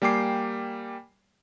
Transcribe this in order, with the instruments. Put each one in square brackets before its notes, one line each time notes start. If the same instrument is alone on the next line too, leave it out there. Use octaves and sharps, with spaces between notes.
[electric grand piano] G3 A#3 G5 G#5 D6 C7